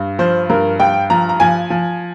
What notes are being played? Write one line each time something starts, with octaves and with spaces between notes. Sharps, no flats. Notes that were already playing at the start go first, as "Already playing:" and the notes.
Already playing: G2
F3 C5
G2 A#4
G2 G5
F3 A#5
A#5
F3 G#5
F3